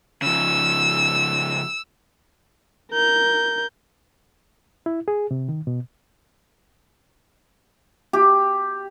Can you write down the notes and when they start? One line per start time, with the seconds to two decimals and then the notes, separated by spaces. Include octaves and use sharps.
0.22 C#3 F3 E6
2.92 A#4 G6
4.86 E4
5.08 G#4
5.31 C3
5.49 D#3
5.67 B2
8.13 G4